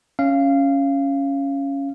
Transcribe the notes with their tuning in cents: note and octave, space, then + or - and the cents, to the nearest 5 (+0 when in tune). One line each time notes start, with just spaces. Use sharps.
C#4 +0 F5 -15